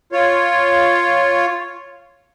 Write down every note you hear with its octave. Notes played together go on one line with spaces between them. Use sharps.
F4 C#5